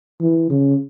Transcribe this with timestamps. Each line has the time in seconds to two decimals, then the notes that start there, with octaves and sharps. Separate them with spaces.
0.21 E3
0.50 C#3